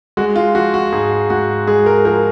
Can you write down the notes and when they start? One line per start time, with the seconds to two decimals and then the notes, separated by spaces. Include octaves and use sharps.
0.17 G#3 F#4
0.36 F4
0.55 F3 F#4
0.74 F#4
0.92 G#2 G#4
1.30 G#2 F#4
1.67 G#3 G#4
1.86 A#4
2.05 F3 A#4